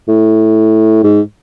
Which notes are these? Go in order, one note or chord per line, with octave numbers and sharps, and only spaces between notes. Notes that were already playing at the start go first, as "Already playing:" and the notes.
A2
G#2